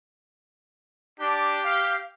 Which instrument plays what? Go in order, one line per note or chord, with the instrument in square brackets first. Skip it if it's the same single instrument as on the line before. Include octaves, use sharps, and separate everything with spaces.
[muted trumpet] D4 [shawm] G4
[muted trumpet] F5